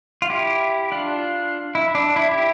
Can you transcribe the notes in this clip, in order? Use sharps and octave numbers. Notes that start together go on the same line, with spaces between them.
F4
E4 G4
D4 F4
E4
D4
E4
E4 G4